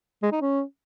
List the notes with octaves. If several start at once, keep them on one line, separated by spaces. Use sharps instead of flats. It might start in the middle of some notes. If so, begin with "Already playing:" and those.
G#3
D#4
C#4